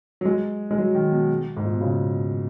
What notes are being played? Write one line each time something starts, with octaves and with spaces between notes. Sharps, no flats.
F#3
G#3
G#3
F#3
D#3
B2
G#2
A#2
B2
C#3